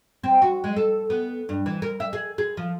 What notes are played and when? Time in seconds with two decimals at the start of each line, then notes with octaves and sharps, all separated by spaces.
0.24 C4
0.42 F#4
0.64 G#3
0.76 A4
1.10 B3
1.49 G2
1.66 E3
1.82 A#4
2.00 E5
2.13 G#4
2.38 G#4
2.57 F3